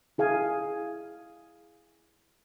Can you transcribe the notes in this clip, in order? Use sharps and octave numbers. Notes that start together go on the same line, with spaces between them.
E4 G#4 F5 G#5